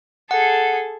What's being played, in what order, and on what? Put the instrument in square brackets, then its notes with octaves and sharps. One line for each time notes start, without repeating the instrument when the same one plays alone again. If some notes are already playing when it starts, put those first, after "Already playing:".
[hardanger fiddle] G#4 A4 [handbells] F#5